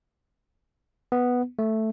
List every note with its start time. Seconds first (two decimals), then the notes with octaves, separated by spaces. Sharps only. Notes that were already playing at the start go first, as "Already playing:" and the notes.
1.12 B3
1.59 A3